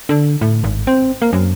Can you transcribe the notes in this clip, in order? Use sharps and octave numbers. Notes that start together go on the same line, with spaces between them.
D3
A2
G#1
C4
A#3
F#2